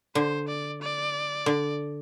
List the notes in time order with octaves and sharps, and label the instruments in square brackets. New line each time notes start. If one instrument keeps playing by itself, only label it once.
[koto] D3 [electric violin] C5
[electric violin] D5
D5
[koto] D3